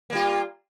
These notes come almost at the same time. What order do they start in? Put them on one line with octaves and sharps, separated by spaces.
A#3 G3 F4